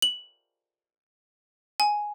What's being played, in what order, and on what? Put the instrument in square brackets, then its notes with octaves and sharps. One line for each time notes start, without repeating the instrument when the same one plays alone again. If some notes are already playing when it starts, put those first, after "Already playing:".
[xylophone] F#7
G#5